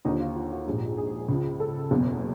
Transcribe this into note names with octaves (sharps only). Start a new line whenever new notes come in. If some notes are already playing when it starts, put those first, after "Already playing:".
D#2 D3 F3 D#4
F4
F4
F#4
A#1 G#2 F3 G4
G#4
C#2 C#3 F3
A4
F#1 E2 B2